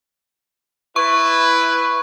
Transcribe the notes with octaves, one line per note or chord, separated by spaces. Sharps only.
E4 B4 C#6